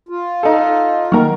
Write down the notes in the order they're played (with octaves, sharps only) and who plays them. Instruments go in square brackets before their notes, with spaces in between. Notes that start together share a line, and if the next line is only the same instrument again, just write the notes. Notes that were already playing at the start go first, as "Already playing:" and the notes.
[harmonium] F4
[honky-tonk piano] D#4 A4
[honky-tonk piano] D#3 A#4 [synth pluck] F#3 A#3